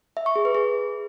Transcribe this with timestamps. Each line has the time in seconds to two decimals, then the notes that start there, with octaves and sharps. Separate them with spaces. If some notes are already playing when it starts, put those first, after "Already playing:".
0.17 E5
0.26 C#6
0.36 G#4
0.45 B4
0.55 G#4